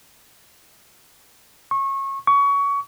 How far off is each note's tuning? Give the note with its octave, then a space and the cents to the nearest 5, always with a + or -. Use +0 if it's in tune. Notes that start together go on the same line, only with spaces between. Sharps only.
C#6 -25
C#6 +25